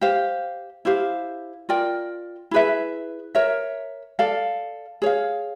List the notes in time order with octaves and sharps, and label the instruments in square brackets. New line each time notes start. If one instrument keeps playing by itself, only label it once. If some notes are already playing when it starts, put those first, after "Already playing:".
[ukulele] G4 C5 F5
E4 G4 C5 F5
F4 A#4 D5 G5
E4 G#4 B4 E5
A#4 C#5 E5
A4 D5 F5
G#4 C#5 F5